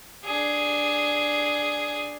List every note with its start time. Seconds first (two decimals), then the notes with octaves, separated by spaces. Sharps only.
0.25 D4 G#4